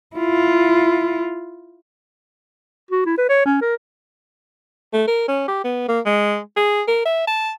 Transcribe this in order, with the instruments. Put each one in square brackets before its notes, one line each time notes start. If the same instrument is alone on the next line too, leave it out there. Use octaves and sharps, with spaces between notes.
[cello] E4 F4
[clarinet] F#4
E4
B4
C#5
C#4
A#4
[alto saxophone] A3
A#4
C#4
G4
B3
A#3
G#3
G#4
A#4
E5
A5